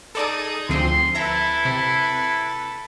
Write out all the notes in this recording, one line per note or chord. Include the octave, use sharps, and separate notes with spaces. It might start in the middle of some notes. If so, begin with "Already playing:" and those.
D#4 G#4 A4 D5 A5
D2 F3 C4 C6
E4 A4 B4 E5 A#5
C3